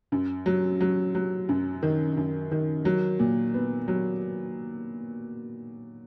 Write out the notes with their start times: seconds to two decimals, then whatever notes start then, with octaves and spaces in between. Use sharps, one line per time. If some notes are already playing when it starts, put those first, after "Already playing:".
0.12 F#2
0.46 F#3
0.80 F#3
1.15 F#3
1.49 F#2
1.83 D#3
2.17 F#2
2.51 D#3
2.85 F#3
3.19 A#2
3.54 B3
3.88 F#3